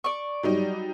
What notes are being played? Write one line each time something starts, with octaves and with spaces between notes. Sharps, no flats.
D5 C#6
F#3 G3 D#4